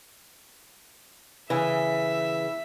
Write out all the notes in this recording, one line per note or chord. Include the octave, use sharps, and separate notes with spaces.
C#3 E3 E5